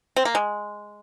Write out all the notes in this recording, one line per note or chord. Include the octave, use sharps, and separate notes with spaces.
C4
A#3
G#3